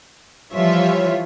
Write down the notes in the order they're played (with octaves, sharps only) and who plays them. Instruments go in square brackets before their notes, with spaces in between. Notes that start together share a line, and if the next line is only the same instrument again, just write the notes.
[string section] E3 F3 G3 F4 C#5 E5